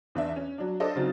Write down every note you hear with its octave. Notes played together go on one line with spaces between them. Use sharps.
E2 D4 E5
C#4
F#3 D4
D4 A4 C5 D5 D#5
C#3 F#3 C4 D#4 F#4 A6